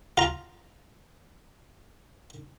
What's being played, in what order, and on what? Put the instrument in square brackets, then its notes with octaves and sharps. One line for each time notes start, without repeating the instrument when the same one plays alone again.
[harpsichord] F4 A#5